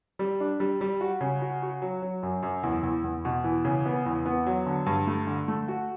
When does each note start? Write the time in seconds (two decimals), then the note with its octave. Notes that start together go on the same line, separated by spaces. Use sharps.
0.19 G3
0.40 D4
0.60 G3
0.81 G3
1.01 F#4
1.21 C#3
1.42 F#4
1.62 F#4
1.82 F#3
2.02 F#3
2.23 F#2
2.43 F#2
2.63 E2
2.83 E2
3.04 E2
3.25 B2
3.44 E3
3.65 C#3
3.86 B3
4.06 E2
4.26 B3
4.47 F#3
4.66 D3
4.86 G2
5.07 A3
5.27 D3
5.48 A3
5.68 F#4